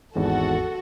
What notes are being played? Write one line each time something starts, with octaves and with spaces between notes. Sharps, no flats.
G#1 E2 G#2 F#4 A4